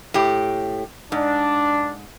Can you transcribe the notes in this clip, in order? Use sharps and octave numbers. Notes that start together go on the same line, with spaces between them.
A2 G4
G#2 D4